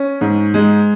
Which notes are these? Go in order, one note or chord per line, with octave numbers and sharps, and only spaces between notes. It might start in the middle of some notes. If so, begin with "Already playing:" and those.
Already playing: C#4
G#2
G#3